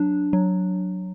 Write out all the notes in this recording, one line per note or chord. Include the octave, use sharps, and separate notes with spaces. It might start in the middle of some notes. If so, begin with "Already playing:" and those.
Already playing: F#3 D4
F#3